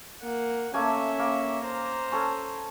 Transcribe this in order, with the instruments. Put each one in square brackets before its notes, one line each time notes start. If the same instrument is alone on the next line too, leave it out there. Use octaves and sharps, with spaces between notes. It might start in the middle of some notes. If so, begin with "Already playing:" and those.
[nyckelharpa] A#3 F#5
[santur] A3 A#3 G#5 [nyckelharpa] C#4 E5
[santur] A#3
[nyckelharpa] C5 A#5
[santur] C#4 A4